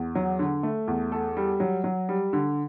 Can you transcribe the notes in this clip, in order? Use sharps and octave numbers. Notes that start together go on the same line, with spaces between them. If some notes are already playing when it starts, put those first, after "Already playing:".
Already playing: E2
F#3
D3
A3
E2
A4
G3
F#3
F#3
G3
D3